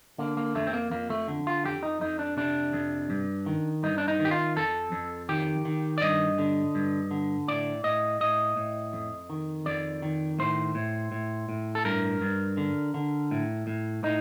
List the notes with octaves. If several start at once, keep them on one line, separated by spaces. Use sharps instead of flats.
D3 A#3
A#3
F2 A3
C4
A#3
F2 A#3
A3
D3
F4
F2 G4
D#4
F2 D#4
D4
C3 D4
F2
G2
D#3
G2 D#4
D4
D#4
D#3
G4
F4
F2 A4
F2
D#3 G4
D#3
D5
G2 D#5
D3
G2
D3
A2 D5
A2 D#5
A2 D#5
A2
F2
D#3
F2 D5
D#3
A2 C5
A2
A2
A2
A4
G2 A#4
G2
D3
D3
A2
A2
A2 D#4